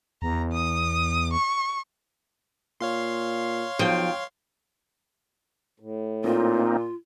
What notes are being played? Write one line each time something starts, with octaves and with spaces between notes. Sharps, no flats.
E2 A#5
D#6
C#6
A#2 C#5 F5 C6
B1 F3 G5
A2
A#2 A#3 C4 D#4 F4